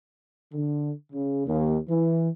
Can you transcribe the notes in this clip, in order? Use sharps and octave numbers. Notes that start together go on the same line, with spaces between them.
D3
C#3
D#2
E3